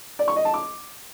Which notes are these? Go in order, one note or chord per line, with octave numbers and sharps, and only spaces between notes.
D5
C#6
D#5
A5
D6